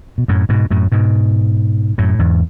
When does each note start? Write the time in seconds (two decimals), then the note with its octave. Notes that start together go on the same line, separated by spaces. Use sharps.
0.18 B2
0.28 F#2 A2
0.49 G#2 B2
0.71 F#2 A2
0.92 G#2 B2
1.98 F#2 A2
2.19 E2 G#2